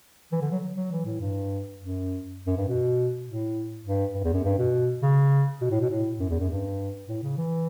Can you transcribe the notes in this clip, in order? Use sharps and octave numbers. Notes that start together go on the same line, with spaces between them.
E3
D3
F#3
F#3
E3
A2
G2
F#2
F#2
G2
B2
A2
G2
G2
E2
F#2
G2
B2
C#3
B2
A2
B2
A2
F#2
E2
F#2
G2
A2
C#3
E3